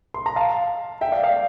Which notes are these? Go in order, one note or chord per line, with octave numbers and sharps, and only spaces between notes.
C6
A#5
F5 A5
E5 G5
D5 F5
D5 F5